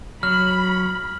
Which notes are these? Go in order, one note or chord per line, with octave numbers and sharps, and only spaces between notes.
F#3 B5 F6